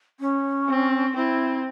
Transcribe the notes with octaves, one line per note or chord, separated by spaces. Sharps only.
C#4
C4
C4 E4